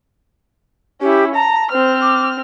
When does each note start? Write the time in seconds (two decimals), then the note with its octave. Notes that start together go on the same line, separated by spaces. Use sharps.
1.01 C#4 E4 G4
1.34 A5 A#5
1.71 C4 C5 F6
2.02 D6